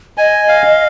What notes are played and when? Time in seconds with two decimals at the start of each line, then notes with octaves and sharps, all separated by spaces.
0.18 D#5 G#5
0.48 F5